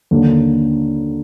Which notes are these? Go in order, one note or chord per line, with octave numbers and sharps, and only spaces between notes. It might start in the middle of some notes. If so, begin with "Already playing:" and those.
D#2 D3 F#3 A#3 F#4